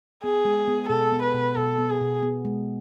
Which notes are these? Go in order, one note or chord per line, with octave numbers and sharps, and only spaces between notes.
B3 G#4
G#3
B3
B2 A4
B3
B4
B2
B2 A4
B3
G#4
B2
B3
G#3